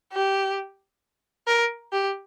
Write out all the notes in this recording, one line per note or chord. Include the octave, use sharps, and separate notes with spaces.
G4
A#4
G4